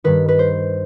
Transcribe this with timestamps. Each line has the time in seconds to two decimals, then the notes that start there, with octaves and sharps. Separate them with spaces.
0.04 G2 D#3 B4
0.29 B4
0.39 C5